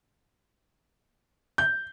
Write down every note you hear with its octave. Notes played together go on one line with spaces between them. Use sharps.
G6